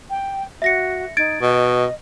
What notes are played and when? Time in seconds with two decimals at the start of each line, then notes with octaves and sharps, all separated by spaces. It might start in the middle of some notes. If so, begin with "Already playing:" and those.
0.10 G5
0.62 F#4 E5 A#6 C#7
1.17 D#4 G#6 A6 D7
1.42 B2 D#5